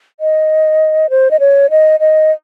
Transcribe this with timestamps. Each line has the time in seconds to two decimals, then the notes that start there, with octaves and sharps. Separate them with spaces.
0.20 D#5
1.10 C5
1.31 D#5
1.40 C#5
1.70 D#5
2.00 D#5